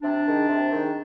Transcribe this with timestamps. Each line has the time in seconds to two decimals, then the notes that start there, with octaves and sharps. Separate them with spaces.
0.03 C3 D4
0.26 D#3 G#3
0.48 C3
0.72 D#3 G#3